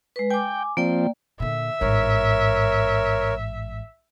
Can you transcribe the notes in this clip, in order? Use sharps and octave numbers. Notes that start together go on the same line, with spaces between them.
G#3 B4
G5 G#5 D6
F3 A#3 C4 D5 G5
A#2 D3 E5
A1 G#2 A#4 C#5